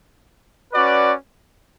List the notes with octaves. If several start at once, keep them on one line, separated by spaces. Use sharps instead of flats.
C#4 F#4 B4 D5